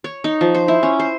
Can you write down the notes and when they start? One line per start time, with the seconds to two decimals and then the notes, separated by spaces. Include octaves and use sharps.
0.04 C#5
0.24 D#4
0.41 F3
0.55 C5
0.68 E4
0.83 C#4
0.99 C5